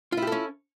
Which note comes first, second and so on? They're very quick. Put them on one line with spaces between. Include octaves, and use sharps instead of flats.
F4 E4 G4 A4 C#4